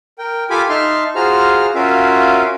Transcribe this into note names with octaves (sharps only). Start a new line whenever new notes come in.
A#4 G5
F4 G4 A4 G#5 B5 D6
D#4 E5 A5 C6 F6
F4 F#4 G#4 C5 A#5 F6
C#4 F4 F#4 A#4 E5 F5